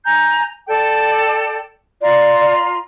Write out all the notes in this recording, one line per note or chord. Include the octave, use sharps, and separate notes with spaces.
G#5 A#5 G6
A4 D5 G5
F4 D5 A#5 C6